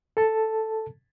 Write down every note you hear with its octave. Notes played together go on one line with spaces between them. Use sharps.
A4 A5